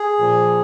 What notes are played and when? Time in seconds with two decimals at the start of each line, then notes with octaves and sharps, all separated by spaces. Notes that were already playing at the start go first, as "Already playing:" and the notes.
Already playing: G#4
0.19 A#2 F3